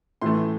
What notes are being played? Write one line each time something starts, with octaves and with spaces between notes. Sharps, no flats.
A2 E3 A3 C6